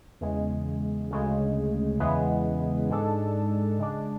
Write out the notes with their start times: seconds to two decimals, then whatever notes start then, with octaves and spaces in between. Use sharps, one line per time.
0.21 E2 C#3 G#3
1.11 D2 C#3 G#3
2.00 E2 C#3 E3 G#3 B3
2.89 G#2 G#3 D4 A4
3.78 C#3 G#3 D4